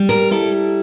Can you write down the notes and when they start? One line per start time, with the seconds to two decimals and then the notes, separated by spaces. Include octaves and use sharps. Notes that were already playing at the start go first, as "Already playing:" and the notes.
Already playing: G3
0.09 A#4
0.31 E4 A4